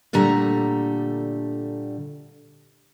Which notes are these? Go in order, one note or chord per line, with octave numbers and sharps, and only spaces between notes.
A#2 D3 G3 A3 A#5